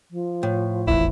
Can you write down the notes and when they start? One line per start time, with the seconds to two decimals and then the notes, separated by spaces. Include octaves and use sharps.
0.11 F3
0.43 A2
0.87 D1 G#1 E2 E4